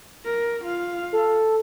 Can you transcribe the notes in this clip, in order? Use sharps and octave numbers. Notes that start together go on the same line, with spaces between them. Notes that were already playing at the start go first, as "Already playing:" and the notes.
A#4
F4 F5
A4